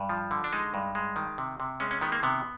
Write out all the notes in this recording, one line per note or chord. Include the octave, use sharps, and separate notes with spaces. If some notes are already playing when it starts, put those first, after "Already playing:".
Already playing: G2
F3
D3
D4
G#3 D#4
G2
G#3
D#3
C3
C3
G#3 C#4
C#4
D#3 B3
A#3
C3 B3